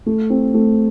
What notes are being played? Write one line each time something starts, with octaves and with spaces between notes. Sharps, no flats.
A3
C4
A3